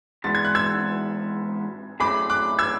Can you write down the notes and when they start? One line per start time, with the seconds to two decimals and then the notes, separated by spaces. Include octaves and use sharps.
0.24 E3 G#3 B3 D4 F#4 A6
0.35 G#6
0.45 F#6
0.55 E6 G#6
2.00 A2 F#3 A3 C#4 G#4 B5 D6
2.30 D6 F#6
2.59 E6 G#6